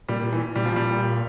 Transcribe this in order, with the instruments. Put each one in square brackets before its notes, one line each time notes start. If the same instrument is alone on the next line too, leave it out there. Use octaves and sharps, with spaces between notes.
[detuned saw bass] A#2 [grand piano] G3
[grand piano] E3
[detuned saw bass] A#2 [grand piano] G3
[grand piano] F3
G3